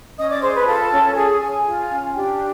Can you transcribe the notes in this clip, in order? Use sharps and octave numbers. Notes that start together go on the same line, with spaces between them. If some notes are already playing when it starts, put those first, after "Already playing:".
C#4 D#5 D#6
D5 D6
G#4 C5 C6
B4 B5
F4 A4 A5
C#4
C#4 G#4 G#5
G#4
F4
C#4
D4 G4 G5